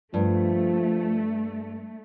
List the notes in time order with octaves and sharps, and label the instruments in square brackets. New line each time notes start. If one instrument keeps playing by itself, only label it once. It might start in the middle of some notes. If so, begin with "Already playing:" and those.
[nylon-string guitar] G2 [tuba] F3 [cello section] A3